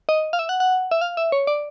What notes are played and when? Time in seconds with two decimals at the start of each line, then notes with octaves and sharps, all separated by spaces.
0.09 D#5
0.33 F5
0.39 E5
0.49 F#5
0.60 F#5
0.91 E5
1.01 F5
1.17 E5
1.32 C#5
1.47 D5